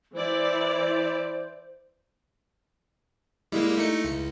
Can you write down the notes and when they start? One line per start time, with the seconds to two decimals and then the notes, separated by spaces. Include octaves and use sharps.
0.14 E3 E4 C5 D5
3.52 G3 G#3 A#3 E4
3.77 A3 D#4 C#7
4.05 C#2